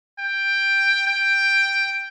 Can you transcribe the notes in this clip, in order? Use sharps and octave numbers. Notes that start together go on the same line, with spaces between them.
G5
G5